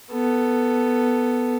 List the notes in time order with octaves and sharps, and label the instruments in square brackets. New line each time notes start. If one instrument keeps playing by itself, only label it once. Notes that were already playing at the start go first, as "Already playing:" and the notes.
[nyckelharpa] B3 A4